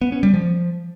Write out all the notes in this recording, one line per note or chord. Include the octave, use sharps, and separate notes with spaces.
B3
C#4
G3
F3